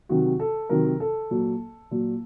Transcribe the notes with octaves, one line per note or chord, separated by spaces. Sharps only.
C3 D#3 F#3 F#4
A4
C3 D#3 F#3 A#4
A4
A#2 F#3
A#2 F#3